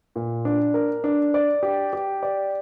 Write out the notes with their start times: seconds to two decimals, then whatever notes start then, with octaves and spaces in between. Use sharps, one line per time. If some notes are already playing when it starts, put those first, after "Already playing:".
0.16 A#2
0.45 D4
0.74 A#4
1.04 D4
1.34 D5
1.63 G4
1.93 G4
2.23 D5